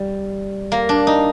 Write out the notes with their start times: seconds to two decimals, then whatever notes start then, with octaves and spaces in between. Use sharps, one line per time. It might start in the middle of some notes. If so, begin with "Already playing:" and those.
Already playing: G3
0.72 A#3
0.89 D4
1.07 D#4